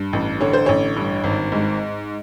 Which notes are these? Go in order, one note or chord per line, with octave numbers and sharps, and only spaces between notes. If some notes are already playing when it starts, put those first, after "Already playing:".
Already playing: G2
A1
D3 C#5
C5
A1 C#5
G2
G#1
G#2